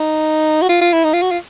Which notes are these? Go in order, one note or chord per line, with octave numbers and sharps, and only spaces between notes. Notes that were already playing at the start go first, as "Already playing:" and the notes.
Already playing: D#4
F#4
F4
F4
E4
D#4
F4
F#4
F4